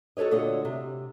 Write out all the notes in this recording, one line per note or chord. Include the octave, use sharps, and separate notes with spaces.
F#4 A4 B4 C#5 D#5
A#2 D3 F#4 D#5
C3